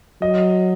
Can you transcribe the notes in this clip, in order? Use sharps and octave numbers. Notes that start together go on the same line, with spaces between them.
F#3 D#5